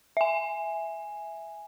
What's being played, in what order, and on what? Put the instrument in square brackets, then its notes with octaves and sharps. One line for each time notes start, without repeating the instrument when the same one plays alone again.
[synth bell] E5 G#5